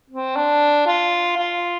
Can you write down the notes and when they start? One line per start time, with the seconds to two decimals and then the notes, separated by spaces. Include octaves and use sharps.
0.10 C4
0.36 D4
0.87 F4
1.37 F4